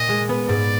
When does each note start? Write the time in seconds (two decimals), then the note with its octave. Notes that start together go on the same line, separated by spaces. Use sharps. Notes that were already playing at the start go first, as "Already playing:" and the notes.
Already playing: A#2 D#5
0.09 G#3
0.29 B3
0.49 G#2 D5